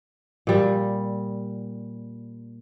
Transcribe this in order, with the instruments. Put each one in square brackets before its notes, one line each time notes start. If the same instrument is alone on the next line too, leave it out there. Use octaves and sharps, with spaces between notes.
[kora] A#2 G3